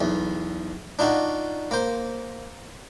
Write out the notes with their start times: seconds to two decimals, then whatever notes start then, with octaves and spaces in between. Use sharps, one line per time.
0.01 B1 E2
0.99 D4 D#4 F4 F#4
1.71 A#3 C5